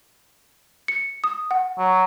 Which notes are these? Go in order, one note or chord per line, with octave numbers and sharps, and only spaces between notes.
C#7
D#6
F#5
F#3